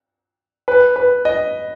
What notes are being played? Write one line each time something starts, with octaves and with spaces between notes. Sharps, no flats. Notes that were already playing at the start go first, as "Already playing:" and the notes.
B4
B4
D#5